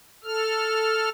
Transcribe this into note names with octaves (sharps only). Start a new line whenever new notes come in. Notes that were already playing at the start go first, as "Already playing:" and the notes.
A4 F6